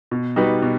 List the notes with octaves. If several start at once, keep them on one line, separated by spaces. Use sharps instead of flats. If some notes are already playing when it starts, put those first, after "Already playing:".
B2
G3 D#4 F#4 B4
B2